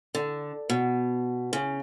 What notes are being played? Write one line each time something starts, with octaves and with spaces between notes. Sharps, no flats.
D3
B2
C#3